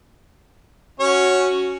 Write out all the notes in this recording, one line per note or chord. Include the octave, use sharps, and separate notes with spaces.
C#4 F#4 C#5